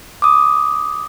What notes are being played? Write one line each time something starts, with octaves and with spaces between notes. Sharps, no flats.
D6 D#6